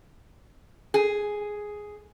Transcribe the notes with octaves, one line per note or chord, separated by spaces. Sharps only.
G#4